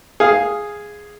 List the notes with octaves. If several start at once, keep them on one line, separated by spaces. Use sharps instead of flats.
G#4 F5